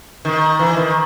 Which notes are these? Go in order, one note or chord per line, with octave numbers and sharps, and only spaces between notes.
D#3
E3
D#3